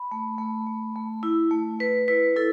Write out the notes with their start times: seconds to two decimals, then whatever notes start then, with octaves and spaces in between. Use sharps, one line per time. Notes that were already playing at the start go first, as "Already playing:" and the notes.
Already playing: B5
0.11 A3
0.38 A3
0.67 A3
0.96 A3
1.23 E4
1.51 A3
1.79 A3 B4
2.08 E4 B4
2.36 E4 A4